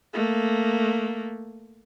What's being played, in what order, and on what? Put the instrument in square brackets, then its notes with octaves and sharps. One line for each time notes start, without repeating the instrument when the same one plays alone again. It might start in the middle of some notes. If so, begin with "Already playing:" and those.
[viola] A3 A#3